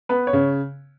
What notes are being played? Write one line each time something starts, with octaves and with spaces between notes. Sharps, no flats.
B3 B4
C#5
C#3